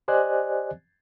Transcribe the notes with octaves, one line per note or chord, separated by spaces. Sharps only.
G4 C5 D5 D#5 G#5 F#6